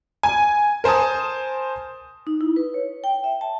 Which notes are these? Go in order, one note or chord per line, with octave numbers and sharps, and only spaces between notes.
G#5
A#4 C5 G#5 A5 D#6
D#4
E4
B4
C#5
G5
E5
A5